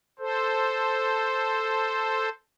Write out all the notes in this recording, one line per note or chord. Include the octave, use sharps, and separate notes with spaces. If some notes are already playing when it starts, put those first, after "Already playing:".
A4 C5